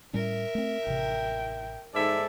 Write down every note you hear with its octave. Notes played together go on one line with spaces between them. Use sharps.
A2 G3 C#4 A#4 E5
A3 C4
A1 C3 G5
G#2 D#4 A4 D5 E5